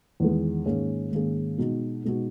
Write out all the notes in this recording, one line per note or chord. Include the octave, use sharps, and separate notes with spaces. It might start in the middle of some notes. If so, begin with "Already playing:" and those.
E2 D#3 G#3
G#2 D#3 A#3 C#4 G#4
G#2 D#3 A#3 C#4 G#4
B2 G#3 B3 D#4 F#4
B2 G#3 B3 D#4 F#4